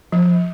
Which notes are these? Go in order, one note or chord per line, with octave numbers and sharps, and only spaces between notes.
F3